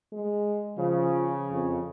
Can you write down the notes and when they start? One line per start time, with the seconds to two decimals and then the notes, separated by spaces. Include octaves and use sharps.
0.13 G#3
0.77 C#3 F3
1.51 F2